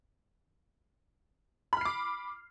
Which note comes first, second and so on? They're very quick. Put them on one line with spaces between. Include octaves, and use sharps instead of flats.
B5 F6 C7 D6